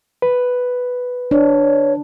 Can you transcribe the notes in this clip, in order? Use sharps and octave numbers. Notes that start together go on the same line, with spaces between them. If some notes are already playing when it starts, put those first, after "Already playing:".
B4
D4 C#5